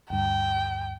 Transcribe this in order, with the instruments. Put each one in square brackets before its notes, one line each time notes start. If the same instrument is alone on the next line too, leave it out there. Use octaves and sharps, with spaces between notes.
[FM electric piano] D2 G2 [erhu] G5